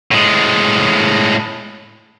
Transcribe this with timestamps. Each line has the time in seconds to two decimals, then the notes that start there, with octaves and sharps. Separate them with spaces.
0.11 A2 G#3